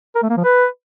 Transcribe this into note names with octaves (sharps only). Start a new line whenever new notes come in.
A#4
A3
A#3
F3
B4